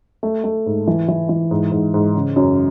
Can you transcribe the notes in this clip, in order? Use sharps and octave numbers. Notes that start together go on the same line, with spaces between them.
A3
A3
G#2
E3
E3
E3
G#2
G#2
G#2
C#3
F#2